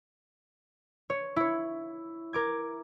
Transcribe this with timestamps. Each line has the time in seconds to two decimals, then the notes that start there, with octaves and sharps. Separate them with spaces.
1.10 C#5
1.36 E4 C#5
2.33 A#4 D6 G#6